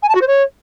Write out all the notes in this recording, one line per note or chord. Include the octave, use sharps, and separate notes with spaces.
G#5
A5
F#4
C5
C#5